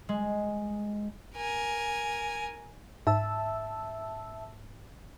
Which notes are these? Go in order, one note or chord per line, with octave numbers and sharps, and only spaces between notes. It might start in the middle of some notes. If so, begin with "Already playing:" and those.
G#3
A#4 G#5
G#2 E5 A5 E6